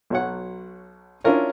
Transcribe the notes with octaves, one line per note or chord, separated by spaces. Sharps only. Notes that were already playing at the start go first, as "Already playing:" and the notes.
B1 F#3 C#5 F#5
C#4 D4 E4 F4 A#4 C#5